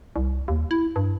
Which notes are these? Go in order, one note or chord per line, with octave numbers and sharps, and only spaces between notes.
C2
D#2
E4
G2